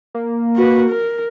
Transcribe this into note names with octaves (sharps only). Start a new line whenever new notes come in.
A#3
F#4 B4
A#4